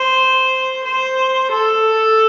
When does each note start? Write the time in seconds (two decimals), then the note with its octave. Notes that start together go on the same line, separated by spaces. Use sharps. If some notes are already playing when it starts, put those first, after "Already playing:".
Already playing: C5
0.85 C5
1.51 A4